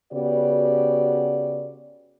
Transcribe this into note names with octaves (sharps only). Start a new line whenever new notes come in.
C#3 B3 F#4 G4 D5